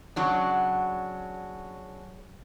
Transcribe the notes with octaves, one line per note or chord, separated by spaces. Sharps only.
C#3 F#3 D4